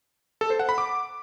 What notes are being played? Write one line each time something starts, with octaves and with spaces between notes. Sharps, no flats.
A4
C5
F#5
B5
D6